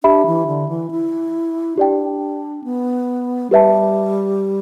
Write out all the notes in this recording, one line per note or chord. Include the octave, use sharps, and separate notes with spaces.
D4 G4 E5 B5
E3
D3
E3
E4
D4 G4 D5 G5
B3
G3 G4 B4 E5 A5